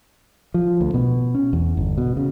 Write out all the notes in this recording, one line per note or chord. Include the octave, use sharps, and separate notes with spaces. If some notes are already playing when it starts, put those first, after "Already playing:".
F3
D2
B2
C#4
E2
G1
B2
C#3